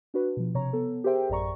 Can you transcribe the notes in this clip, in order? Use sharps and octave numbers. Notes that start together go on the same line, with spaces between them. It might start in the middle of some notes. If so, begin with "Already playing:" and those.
D4 F#4 B4
B2 F3
C3 C#5 A#5
B3 A4
G4 G#4 A#4 C5 E5 G5
A1 F#2 D5 A#5 C#6